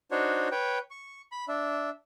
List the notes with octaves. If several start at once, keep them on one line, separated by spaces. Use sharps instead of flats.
D4 D#4 F#4 C5 C#5
B4 C#5 G5
C#6
B5
D4 E5